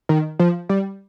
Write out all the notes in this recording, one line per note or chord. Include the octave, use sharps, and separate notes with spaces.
D#3
F3
G3